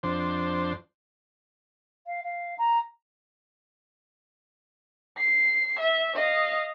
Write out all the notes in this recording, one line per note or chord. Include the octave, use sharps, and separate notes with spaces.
F2 D4 C5
F5
F5
A#5
C7
E5
D#5 F5